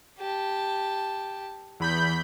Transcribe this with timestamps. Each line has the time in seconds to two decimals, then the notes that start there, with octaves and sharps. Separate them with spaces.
0.18 G4 A5
1.80 E2 B5 G6